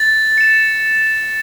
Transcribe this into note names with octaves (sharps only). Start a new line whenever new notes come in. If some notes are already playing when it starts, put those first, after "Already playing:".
Already playing: A6
C#7 E7